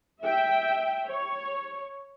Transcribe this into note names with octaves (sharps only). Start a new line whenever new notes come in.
E5 G5
C#5